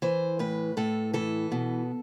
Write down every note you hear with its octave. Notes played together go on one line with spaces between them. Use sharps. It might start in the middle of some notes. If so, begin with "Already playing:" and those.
E3 C5
A2 B4
A2 A4
E3 A4
B2